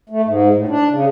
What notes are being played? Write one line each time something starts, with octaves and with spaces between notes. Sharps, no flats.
A3
G#2
A2
D4
C#3